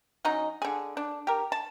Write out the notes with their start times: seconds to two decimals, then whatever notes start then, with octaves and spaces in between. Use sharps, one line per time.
0.25 F#3 C#4 D#4 D#5
0.62 D3 G#4
0.97 D4
1.27 G4 A#4
1.52 A5